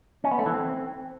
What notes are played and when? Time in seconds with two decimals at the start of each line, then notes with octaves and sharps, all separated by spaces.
0.24 C#4
0.31 B3
0.39 A3
0.46 E3
0.54 C4